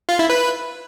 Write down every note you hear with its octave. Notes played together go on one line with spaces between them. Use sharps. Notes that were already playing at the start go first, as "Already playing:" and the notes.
F4
E4
B4